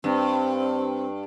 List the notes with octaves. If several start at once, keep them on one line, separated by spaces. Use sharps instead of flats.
G2 C4